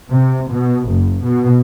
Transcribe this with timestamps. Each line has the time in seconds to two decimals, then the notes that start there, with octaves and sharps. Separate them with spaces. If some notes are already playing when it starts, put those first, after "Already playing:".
0.10 C3
0.50 B2
0.88 F#1
1.24 B2